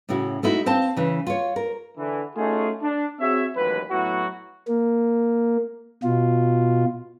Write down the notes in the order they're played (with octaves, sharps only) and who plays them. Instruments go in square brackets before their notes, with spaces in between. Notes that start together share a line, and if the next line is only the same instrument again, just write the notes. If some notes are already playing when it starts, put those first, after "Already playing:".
[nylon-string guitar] A2 C#3 E4 F#4
A3 D#4 E4 F#4
C4 C5 F5 A5
C#3 E3
F4 C#5
A#4
[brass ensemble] D3 E3
A3 C#4 D#4 F4 F#4 G#4
D4
C4 F#4 G#4 C#5 E5
A1 D#2 F#3 G#3 B4
A2 F#3 B3 E4 F#4
[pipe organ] A#3
B2 F4